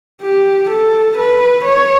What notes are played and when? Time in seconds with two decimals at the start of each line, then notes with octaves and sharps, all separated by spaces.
0.22 G4
0.69 A4
1.17 B4
1.64 C#5